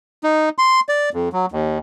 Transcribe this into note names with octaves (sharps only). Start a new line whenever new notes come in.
D#4
C6
D5
F2
F#3
D#2